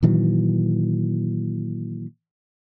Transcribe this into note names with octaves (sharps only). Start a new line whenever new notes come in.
A#2 D#3 E3 F#3